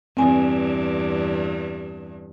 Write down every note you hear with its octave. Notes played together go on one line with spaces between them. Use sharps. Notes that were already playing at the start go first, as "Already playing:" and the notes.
E2 G2 C4 G#5